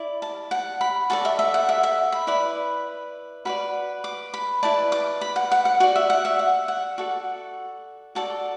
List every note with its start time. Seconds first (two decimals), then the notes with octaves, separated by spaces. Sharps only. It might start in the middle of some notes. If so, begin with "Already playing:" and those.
Already playing: E4 D5
0.22 A5
0.51 F#5
0.81 B5
1.10 F#4 A4 D5 A5
1.25 E5
1.39 E5
1.54 F#5
1.69 E5
1.83 E5
2.12 B5
2.27 E4 B4 D5 B5
3.45 F#4 B4 D5 B5
4.04 D6
4.34 B5
4.63 E4 B4 D5 A5
4.92 D6
5.21 B5
5.36 F#5
5.52 F#5
5.65 F#5
5.80 F#4 D5 F#5
5.96 E5
6.10 F#5
6.25 E5
6.39 F#5
6.68 F#5
6.98 F#4 A4 D5
8.15 F#4 A4 D5 A5